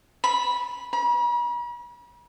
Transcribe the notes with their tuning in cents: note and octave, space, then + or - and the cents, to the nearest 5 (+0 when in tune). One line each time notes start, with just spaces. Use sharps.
B5 -15
B5 -45